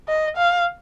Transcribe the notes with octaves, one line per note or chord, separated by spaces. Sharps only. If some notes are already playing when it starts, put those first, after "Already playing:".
D#5
F5